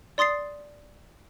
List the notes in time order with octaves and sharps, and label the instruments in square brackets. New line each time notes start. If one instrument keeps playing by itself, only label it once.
[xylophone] D5 C6 D#6 A6 C7